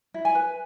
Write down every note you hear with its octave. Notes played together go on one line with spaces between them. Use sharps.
E4
G#5
B4